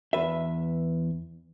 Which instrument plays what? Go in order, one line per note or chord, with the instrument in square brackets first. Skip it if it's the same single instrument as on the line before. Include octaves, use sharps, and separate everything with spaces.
[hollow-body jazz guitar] E2 B4 E5